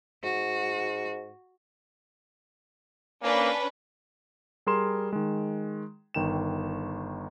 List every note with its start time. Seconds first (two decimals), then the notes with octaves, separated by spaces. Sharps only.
0.23 G#2 F#4
3.23 A#3 C#4 D4 B4
4.66 G3 G#4 A#4 C6 E7
5.13 D#3 G#3
6.14 G1 D#3 G5 E7